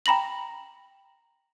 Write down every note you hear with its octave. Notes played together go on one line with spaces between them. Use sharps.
G5 A#5 B5 A#6 F#7